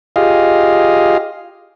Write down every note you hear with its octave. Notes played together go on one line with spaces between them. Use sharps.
F4 G4 G#4 D#5 F5